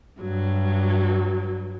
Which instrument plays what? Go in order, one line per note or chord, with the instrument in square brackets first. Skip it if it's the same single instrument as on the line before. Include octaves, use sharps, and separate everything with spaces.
[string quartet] G2 F#3